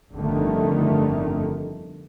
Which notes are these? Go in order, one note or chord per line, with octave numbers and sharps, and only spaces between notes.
G1 F2 D3 D#3 A3